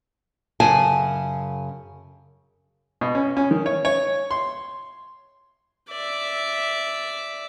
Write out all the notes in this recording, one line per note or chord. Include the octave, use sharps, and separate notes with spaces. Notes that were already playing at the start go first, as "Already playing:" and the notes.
F#2 C#3 G#4 F#5 G#5 A5
B2
C#4
C#4
D#3
C#5
C#5
C6
D5 E5